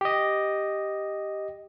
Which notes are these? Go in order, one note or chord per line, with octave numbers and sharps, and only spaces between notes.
G4 D#5